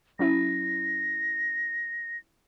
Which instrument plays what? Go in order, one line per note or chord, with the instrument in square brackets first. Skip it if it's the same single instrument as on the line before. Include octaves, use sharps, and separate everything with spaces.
[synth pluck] F#3 C#4 E4 [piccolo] A#6